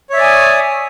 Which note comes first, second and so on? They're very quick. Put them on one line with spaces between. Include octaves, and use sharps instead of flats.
C#5 E5 D5 G#5 D#6